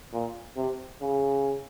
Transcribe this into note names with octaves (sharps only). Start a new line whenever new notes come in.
A#2
C3
C#3